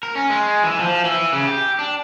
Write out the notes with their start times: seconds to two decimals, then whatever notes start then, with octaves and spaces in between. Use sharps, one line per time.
0.03 A#4
0.15 C#4
0.30 G#3
0.64 E3
0.80 F3
1.05 E3
1.33 C#3
1.47 G4
1.79 D4